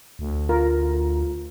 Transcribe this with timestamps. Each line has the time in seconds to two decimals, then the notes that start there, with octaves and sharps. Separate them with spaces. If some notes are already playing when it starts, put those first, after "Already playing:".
0.19 D2
0.49 F4 A#4